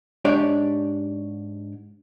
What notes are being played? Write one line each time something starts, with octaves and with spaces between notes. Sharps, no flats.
G#2 D4 G4 C#5 D5